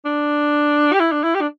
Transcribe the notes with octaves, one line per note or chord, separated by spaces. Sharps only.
D4
G4
E4
D4
E4
G4
D4